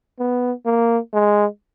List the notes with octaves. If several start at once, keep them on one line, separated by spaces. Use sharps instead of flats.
B3
A#3
G#3